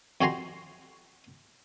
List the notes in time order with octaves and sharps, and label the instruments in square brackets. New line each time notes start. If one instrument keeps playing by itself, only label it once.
[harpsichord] F2 F#4 G4 G#5 A#5 C6